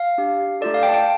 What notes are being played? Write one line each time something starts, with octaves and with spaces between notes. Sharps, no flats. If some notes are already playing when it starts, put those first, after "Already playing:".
Already playing: F5
D4 G4
A3 F4 A4 D5
F5
G5
A5
G5